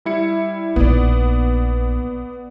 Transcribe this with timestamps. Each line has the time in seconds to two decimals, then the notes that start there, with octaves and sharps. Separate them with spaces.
0.05 G3 E4 C#7
0.76 A#1 B3 D#4 D5